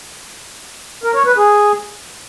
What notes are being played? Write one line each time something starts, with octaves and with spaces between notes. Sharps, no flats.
A#4
C#5
B4
G#4